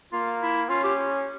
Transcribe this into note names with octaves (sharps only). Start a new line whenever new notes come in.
A#3 F4
E4
C#4 F4
G4